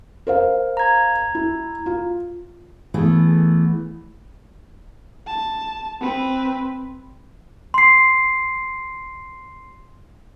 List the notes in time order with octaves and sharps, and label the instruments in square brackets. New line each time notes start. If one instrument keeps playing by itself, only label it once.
[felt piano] A#4 C5 F5
[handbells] A#5 G#6
[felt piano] E4
F4
[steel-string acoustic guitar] E3 A3 B3 G#4
[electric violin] A5
C4 B4
[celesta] C6 C7